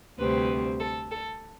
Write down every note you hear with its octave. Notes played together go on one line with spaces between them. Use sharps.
D2 C3 G3 C4 B4
A4
A4